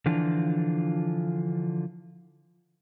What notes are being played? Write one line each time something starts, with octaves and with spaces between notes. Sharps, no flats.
D3 E3 F3 D4 F4